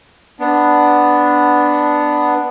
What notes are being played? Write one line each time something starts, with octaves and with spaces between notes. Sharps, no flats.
B3 D4